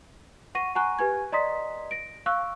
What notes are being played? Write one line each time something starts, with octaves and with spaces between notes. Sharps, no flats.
F#5 C#6 A#6 D#7
F#5 G#5 A#5 C#6 F#6
G4 B4 G#5 G#6
D5 D#5 A#5 C6 D#6 B6
A#6 D7
F5 C#6 E6 F#6